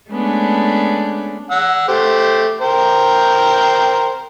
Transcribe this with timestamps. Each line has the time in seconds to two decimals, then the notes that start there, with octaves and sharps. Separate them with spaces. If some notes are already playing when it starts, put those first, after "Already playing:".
0.10 G#3 A3 B3 C#4 D4
1.51 F#5 E6
1.88 A3 G4 C5
2.61 A#4 C5 G5